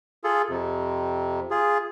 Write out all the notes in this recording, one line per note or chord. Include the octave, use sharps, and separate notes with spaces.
F4 G#4 A4
F2 C3
F4 G#4